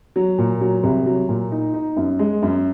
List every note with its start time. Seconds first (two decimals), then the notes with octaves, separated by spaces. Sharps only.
0.16 F#3
0.38 A#2
0.61 F#3
0.84 C2
1.06 F#3
1.29 A#2
1.51 D#4
1.74 D#4
1.96 F#2
2.19 G#3
2.42 F#2